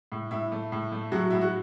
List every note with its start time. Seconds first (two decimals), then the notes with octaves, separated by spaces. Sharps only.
0.12 A2
0.31 A2 E4
0.52 A3
0.72 A2
0.92 A3
1.12 A2 F#3 F#4
1.30 A2 E4
1.41 F#4